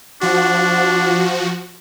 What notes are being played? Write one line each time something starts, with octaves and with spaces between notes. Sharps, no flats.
F3 D4 F#4